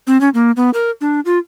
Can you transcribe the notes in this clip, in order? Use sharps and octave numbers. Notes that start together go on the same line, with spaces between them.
C4
C#4
A#3
B3
A#4
D4
F4